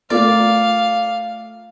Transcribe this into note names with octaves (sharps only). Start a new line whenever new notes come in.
A3 F4 A#4 D5 F5